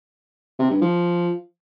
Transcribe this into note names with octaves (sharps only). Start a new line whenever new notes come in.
C3
G2
F3